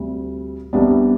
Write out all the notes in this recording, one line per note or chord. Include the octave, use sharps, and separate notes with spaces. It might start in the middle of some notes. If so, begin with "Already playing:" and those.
Already playing: D2 C3 G3
C2 C3 G3 B3 D4